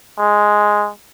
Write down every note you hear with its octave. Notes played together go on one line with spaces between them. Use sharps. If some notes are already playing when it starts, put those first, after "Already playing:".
G#3